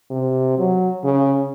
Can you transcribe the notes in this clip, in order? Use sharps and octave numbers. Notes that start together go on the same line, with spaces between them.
C3
F#3
C#3